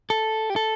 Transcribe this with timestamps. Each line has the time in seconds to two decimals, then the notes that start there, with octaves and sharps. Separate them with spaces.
0.10 A4
0.50 G4
0.56 A4